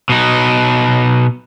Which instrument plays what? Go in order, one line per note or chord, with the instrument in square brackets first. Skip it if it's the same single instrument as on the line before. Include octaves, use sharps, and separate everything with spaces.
[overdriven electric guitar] B2 D#4